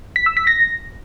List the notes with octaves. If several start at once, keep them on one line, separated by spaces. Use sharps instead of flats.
B6
E6
B6
A#6